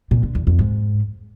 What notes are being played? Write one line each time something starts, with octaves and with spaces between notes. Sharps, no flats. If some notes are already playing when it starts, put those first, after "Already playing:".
A#2
D3
E2
F2
G#2